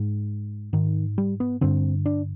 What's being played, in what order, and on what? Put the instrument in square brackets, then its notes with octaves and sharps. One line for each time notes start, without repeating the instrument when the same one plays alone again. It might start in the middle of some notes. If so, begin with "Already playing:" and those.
Already playing: [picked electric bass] G#2
G#2 D#3
G3
B3
G2 D3 C4
D4